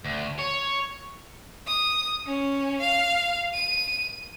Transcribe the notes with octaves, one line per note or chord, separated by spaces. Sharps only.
D2
C#5
D#6
C#4
F5
D#7